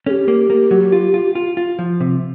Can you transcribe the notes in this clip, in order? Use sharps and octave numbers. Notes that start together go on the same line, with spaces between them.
C#4 G4 A4
A#3
A#3
F#3
F4
F4
F4
F4
F3
C3